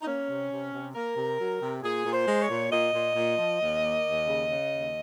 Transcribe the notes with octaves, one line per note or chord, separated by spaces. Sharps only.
D#4
A#3 C#4
C3
C3
C3
A#3 A#4
C3
F#3
C3
A#2 G#4
A#2
C5
G#3
C#5
A#2
A#2 D#5
A#2
A#2
F3
D#2
A#3
D#2
C#3
C#3
D#2